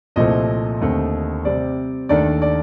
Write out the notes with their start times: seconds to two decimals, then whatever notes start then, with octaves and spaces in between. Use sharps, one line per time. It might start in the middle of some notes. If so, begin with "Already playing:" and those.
0.16 C2 A#2 F3 A3 C4 D#5
0.81 D#2 D3 A3 C4
1.45 C3 G3 C4 D5
2.09 D#2 D#3 A3 D4 D5
2.42 D5